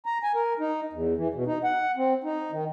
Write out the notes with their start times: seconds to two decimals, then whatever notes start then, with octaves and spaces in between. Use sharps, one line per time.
0.06 A#5
0.23 G#5
0.35 A#4
0.60 D#4
0.93 E2
1.17 E3
1.34 B2
1.47 D#4
1.64 F#5
1.97 C4
2.24 D#4
2.52 D#3